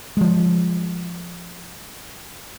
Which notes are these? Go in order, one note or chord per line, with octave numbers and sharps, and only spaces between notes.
F3 G#3